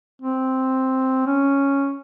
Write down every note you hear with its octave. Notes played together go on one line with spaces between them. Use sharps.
C4
C#4